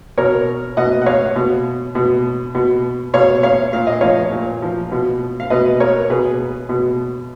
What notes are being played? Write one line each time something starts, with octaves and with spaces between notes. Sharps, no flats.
B2 A#4 C#5
B2 D#5 F#5
F#5
C#5 F5
B2
B2
B2
B2 C#5 F5
C#5 F5
A#2 F5
D#5
F3 C#5 F5
A#2
F3
B2
F5
B2 B4 D#5
A#4 C#5
B2 G#4 B4
B2